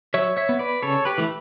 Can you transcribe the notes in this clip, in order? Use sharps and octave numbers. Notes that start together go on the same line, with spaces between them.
F#3 C#5 E5
C#5 E5
B3
B4 D5
C#3 A4 C#5
G4 B4
E3 A3